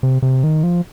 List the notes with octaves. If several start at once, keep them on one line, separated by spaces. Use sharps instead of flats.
C3
C3
D#3
F3